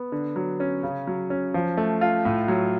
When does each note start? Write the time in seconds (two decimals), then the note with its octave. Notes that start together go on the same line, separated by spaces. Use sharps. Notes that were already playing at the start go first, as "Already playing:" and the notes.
Already playing: B3
0.12 D3
0.36 F#3
0.60 C#4
0.83 C#3
1.07 F#3
1.30 C#4
1.54 F3
1.77 A3
2.01 F4
2.25 A2
2.48 F#3